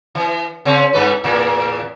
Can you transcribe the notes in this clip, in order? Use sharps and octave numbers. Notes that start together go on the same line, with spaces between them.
E3
C#3 C4 C#4
G2 A3 B4
E2 A2 A#3